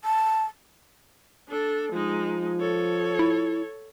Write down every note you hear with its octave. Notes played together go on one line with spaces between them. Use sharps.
A5
D4 A4
F3 G#3 D#4
A4 C#5
E4